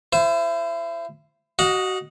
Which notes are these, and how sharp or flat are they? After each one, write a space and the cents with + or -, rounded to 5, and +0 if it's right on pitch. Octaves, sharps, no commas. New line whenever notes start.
E4 +35 C5 +0
F#4 +25 D#5 +0 F#5 -30